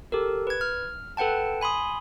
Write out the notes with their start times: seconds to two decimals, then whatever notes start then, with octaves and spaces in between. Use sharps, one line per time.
0.12 G4 A4 A#4
0.47 B4 G#6
0.61 F6
1.17 A4 B4 F#5 G5 A5
1.61 G#5 B5 C6 D#6